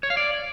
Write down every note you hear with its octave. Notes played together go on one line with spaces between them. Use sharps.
C#5
F5
D5